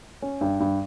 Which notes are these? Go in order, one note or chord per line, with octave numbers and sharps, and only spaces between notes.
C#4
G2
G2